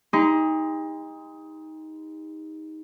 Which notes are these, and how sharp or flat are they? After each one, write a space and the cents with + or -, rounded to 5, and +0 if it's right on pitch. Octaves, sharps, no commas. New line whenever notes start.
D#4 +15 G4 +45 C6 -30